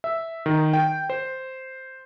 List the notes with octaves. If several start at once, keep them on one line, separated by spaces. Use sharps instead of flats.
E5
D#3
G5
C5